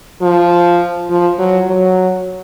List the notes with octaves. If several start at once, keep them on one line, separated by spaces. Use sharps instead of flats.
F3
F3
F#3
F#3